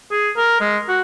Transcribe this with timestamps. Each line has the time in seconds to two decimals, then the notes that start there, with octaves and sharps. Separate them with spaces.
0.11 G#4
0.37 A#4
0.61 G#3
0.88 F#4